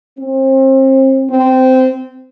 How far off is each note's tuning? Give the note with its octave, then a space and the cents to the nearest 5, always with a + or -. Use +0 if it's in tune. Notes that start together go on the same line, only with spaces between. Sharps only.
C4 +35
C4 -15